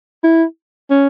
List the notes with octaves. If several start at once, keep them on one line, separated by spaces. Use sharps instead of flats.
E4
C#4